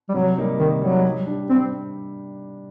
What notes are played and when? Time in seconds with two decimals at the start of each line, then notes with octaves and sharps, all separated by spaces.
0.09 G3
0.14 C3 F#3
0.38 G3 A#3 D#4
0.59 C3 D#3
0.82 F#3 G3 A#3 D#4
1.05 G3
1.27 D4 G4
1.50 G3 C4